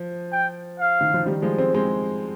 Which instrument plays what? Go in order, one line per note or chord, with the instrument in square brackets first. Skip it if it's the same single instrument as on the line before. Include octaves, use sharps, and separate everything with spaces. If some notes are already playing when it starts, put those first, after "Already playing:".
Already playing: [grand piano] F3
[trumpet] G5
F5
[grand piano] D#3
F3
D#3 G3
G3
F3 G#3
G#3 C4
G#3 C4